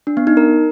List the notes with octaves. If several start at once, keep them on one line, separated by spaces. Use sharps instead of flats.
D4
B3
D#4
A#4